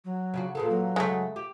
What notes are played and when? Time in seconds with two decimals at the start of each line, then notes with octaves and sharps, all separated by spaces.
0.05 F#3
0.34 C#3 D4 F#4
0.55 A#2 E3 G#4 A4
0.70 F#3
0.96 F#2 C#3 G#3 A3
1.36 G4